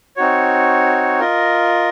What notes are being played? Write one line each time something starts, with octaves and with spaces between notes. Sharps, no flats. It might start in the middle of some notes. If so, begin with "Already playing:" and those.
C4 D#4 F#4 C#5
F4 A#4 D#5